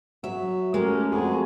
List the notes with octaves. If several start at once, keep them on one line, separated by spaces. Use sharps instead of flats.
F#3 E5
G#3 A3 C#4 G4 A#4
F2 F#4 G#4 A4